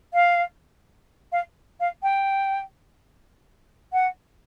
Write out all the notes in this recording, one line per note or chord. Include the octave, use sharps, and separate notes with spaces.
F5
F5
F5
G5
F#5